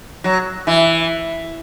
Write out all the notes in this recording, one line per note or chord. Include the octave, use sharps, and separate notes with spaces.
F#3
E3